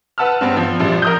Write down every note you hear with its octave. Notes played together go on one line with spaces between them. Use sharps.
B4 F#5 A5 E6 F6
G2 B3 C4
F3
A#1 F3 G3
A#4 D#6 G6